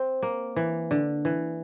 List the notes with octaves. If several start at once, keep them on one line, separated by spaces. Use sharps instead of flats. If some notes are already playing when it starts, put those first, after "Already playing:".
Already playing: C4
A#3
E3
D3
E3